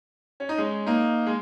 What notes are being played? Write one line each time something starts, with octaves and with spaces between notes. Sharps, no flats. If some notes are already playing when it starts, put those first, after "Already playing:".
C#4
D#4
G#3 C#4
A#3 D#4
G#3